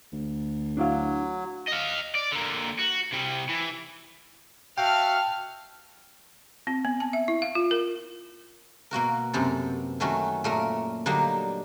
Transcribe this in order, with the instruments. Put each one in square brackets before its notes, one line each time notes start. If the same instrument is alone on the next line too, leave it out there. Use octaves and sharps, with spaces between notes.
[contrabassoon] D2
[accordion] F#3 [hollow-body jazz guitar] D4 E4 F5
[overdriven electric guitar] D#5 F5
D5
D3 A#3
F#4
C3 G3
E3
[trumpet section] F#4 E5 F5 [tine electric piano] G5 [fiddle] A5 F6
[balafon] C4
B3
A5
E5
E4
F5
F4
A#4
[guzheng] B2 A#3 F#4 A#4
F#2 C3 B3 A4
D#3 F#3 A3 C#4 F#4
A#2 A3 A#3 A#4
D3 F#3 G3 A#3 D4 D#4